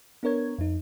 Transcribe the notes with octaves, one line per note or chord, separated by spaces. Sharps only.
B3 D4 A#4 C#5 G#6
F2 D#4